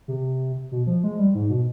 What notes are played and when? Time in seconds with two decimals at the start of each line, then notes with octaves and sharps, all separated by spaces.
0.08 C3
0.72 B2
0.87 F3
1.03 G#3
1.18 G3
1.35 G#2
1.50 B2